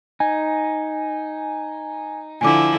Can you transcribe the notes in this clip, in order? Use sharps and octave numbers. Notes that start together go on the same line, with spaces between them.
D#4 G#5
D3 F3 E4 G#5 D6